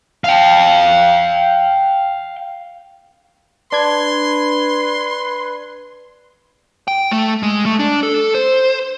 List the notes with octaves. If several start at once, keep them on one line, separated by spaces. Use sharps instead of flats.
F5 G5
D4 B4 C6 G#6
G5
A3
G#3
A3
D4
A4
C5